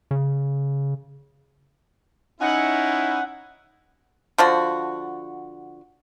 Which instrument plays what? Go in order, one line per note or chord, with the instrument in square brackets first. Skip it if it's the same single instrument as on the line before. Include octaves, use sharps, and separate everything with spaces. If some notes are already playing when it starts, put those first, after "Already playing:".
[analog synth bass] C#3
[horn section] C#4 D#4 E4 [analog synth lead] F#5
[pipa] D3 F3 F#4